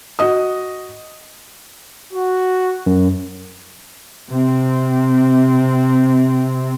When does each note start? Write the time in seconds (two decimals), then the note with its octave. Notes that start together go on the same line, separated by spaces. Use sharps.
0.19 F#4 D#5 D#6
2.13 F#4
2.86 F#2
4.30 C3 C4